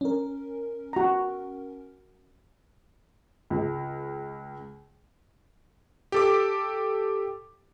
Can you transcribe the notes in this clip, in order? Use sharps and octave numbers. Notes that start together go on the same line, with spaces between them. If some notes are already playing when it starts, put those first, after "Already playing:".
C#4 A#4
F#4 A#5
C#2
G4 A4 D6